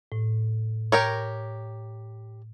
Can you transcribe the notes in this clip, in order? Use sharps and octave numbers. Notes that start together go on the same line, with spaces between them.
A2
G4 A#4 C#5